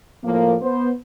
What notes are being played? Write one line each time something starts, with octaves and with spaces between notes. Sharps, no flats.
A2 F3 A#3
B3 C5